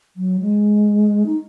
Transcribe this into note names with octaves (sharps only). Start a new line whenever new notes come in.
F#3
G#3
D#4